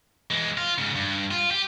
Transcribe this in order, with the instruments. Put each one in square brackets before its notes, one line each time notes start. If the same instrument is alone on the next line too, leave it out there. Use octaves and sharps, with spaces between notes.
[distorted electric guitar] E3 G#3
F4
G#2 C#3
G2
F4
G4